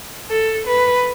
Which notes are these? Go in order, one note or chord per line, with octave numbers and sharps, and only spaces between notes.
A4
B4